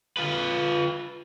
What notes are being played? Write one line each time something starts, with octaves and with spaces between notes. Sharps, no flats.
F4 B4